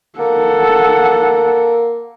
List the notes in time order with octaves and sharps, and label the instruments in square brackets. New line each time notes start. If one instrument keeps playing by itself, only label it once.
[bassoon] A#3 [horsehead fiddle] A4 F#5